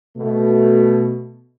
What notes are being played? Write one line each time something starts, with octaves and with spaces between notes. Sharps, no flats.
B2 A3